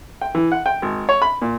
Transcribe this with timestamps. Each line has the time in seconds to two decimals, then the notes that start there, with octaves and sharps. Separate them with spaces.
0.21 G5
0.35 E3
0.52 F#5
0.66 G5
0.82 G#1
1.09 C#5
1.22 B5
1.42 A#2